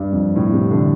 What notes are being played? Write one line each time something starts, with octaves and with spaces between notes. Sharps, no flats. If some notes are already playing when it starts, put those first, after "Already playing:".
Already playing: G2
F2
A2
C3
D3